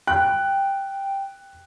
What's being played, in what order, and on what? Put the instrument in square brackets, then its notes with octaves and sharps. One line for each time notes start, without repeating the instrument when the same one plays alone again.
[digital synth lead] G5 [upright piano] F#6